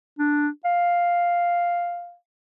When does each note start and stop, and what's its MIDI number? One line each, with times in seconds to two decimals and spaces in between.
0.19 0.48 62
0.65 2.15 77